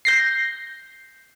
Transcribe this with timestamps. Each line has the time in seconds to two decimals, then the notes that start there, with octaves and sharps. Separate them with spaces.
0.05 G6 A#6 C7